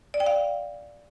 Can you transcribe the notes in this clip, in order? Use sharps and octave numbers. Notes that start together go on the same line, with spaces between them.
D5
G5
F5